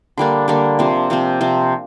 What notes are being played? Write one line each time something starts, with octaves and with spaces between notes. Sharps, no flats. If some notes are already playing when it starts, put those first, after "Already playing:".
D3 G3 A#3 D4
D3 G3 A#3 D4
C3 F3 C4
C3 F3 C4
C3 F3 C4